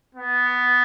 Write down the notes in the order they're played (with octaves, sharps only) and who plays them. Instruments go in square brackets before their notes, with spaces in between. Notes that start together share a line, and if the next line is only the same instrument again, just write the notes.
[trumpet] B3